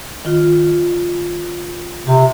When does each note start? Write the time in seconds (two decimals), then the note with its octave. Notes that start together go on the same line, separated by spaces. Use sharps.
0.25 D#3 F4
2.07 C3 G4